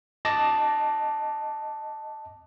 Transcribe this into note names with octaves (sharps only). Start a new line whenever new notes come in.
D#5 A5 D6 A#6